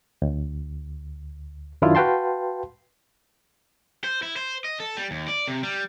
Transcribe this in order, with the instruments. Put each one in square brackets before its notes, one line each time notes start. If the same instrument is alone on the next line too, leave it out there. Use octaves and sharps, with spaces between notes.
[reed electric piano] D2
F#2 D#3 F#3 D4 E4 F4
F#4 B4 F5 G5 A5 C6
[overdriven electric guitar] C5
E4
C5
D#5
A4
G3
D#2
D5
C3
G3